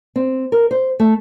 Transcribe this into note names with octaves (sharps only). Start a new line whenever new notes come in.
C4
A#4
C5
A3